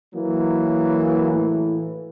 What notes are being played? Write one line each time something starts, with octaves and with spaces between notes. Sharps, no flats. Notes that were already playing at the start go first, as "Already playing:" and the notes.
E3 F#3 A#3
A2 E3